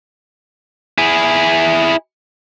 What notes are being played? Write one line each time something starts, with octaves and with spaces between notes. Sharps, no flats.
E4 G#4